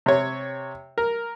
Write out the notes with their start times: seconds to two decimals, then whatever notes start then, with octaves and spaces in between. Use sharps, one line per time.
0.06 C3 C#5
0.98 A#4